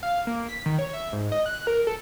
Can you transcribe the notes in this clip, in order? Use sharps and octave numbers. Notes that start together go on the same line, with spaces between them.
F5
A#3
B6
D#3
C#5
E5
G#2
D#5
F#6
A#4
A4